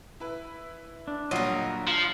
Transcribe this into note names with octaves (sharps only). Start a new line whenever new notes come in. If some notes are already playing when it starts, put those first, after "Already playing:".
E4 B4
D4
A#1 D3 F#3 G3 A#3 F4 D#5
F3 F4